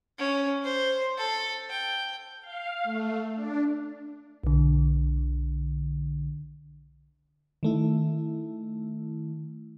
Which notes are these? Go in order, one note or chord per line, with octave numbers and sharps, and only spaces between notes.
C#4
C5
A4
G5
F5
A3
D4
B1 D3
D#3 A3 E4